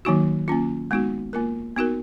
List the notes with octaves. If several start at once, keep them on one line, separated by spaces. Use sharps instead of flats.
D#3 F#3 A#3 D#4 F#4
A#3 C#4 F4
G#3 B3 D#4 F#4
A#3 F4 A#4
B3 D#4 F#4 A#4